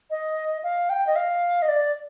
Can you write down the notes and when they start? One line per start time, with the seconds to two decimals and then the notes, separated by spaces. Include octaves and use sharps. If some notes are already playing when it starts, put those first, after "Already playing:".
0.10 D#5
0.63 F5
0.89 G5
1.07 D#5
1.16 F5
1.62 D#5
1.68 D5